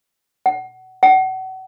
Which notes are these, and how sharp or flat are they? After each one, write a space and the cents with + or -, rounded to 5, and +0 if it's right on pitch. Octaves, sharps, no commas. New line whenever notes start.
F#5 +25
F#5 +35